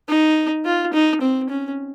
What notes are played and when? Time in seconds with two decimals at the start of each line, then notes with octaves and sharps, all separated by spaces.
0.09 D#4
0.65 F4
0.94 D#4
1.21 C4
1.50 C#4